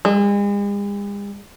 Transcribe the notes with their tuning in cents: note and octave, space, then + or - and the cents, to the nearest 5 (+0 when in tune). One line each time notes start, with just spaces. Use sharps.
G#3 -45